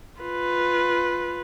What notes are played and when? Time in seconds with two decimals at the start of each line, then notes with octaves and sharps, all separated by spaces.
0.21 F4 B4